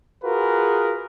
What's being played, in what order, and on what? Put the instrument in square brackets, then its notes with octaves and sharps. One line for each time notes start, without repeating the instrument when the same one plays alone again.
[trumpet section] F4 F#4 G#4 A#4 B4